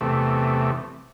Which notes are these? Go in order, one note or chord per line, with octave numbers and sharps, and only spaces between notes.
E2 C3 A3